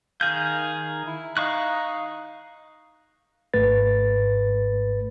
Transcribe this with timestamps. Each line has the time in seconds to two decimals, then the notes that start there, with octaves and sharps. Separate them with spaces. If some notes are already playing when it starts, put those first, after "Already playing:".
0.21 D#3 G#4 F5 G6
1.07 E4
1.37 D#4 F5 C#6 F#6
3.54 G#1 G#2 A3 B4 A6